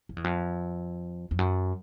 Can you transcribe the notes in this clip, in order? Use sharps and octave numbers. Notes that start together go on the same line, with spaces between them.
F2
E2
F2
F2
F#2